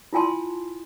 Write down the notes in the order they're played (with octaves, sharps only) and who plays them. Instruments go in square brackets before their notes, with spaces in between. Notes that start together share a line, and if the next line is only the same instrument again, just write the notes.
[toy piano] E4 F4 G#5 A5 C6